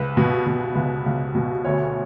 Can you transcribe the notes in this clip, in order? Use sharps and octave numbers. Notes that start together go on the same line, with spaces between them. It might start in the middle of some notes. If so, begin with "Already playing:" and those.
Already playing: C#2 B4
B2
B2
C#2
C#2
B2
D2 C#5